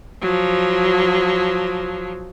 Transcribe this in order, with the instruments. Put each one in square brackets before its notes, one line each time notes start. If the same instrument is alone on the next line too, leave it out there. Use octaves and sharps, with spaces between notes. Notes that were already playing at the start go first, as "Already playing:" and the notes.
[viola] F3 F#3